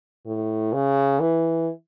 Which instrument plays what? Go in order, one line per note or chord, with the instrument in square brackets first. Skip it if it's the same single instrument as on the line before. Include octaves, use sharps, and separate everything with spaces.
[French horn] A2
C#3
E3